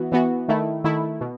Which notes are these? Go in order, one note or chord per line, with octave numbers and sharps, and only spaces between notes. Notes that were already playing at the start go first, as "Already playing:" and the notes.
Already playing: E3 B3 F#4
E3 B3 F#4
D#3 A3 E4
D#3 A3 E4
B2